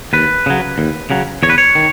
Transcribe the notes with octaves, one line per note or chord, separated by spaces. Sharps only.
D#2 B4
C#3 F#3
D#2
C#3 F#3
E2 C#5
B4
C#5
D#3